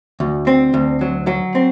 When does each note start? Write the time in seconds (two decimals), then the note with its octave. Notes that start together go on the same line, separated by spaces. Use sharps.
0.20 D2
0.47 C4
0.74 D2
1.01 F#3
1.27 F#3
1.55 C4